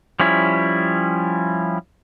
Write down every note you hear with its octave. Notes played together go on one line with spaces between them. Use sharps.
F3 G3 C#4 E4